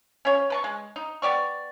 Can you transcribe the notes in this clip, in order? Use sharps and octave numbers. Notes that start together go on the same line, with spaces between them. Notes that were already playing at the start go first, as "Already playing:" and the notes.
C#4 F4 C#5
B4 A5 C#6
G#3
D#4
B3 G4 D5 C#6